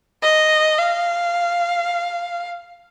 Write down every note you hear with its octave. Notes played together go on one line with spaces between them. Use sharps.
D#5
F5